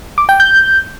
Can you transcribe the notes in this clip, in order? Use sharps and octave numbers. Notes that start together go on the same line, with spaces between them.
D6
G5
G6